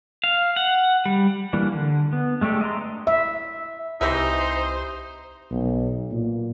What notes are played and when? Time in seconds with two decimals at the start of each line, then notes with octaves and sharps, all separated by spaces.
0.24 F5
0.56 F#5
1.06 G3
1.53 E3 G3 A#3 D4
1.72 D3
2.13 B3
2.41 G#3 A3 D4 G4 A4
2.61 D#5 E5 A#5 C6
3.07 E5
4.01 C2 E3 C4 D#4 G4 C5 E5 A#6
5.51 B1
6.11 A#2